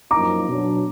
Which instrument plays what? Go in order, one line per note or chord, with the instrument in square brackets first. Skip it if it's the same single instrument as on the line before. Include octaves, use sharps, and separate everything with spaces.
[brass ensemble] F#2 F3 A#3 D#4 [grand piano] A#5 D6
[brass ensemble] B2 F#3 D4